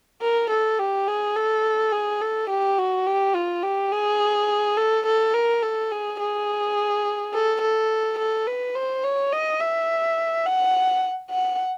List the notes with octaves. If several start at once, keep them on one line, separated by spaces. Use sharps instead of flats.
A#4
A4
G4
G#4
A4
G#4
A4
G4
F#4
G4
F4
G4
G#4
A4
A4
A#4
A4
G#4
G#4
A4
A4
A4
B4
C5
C#5
D#5
E5
F#5
F#5